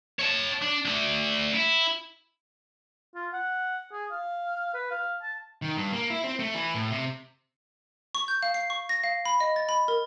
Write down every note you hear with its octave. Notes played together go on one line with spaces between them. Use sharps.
C#5 A5
D4
A3 D4
E4
F4
F#5
G#4
F5
B4
F5
A5
D#3
G2
A#3
E4
C4
A3
E3
A2
C3
C#6
G6
F5
C7
C#6
A#6
F5
B5
D#5
A6
B5
A#4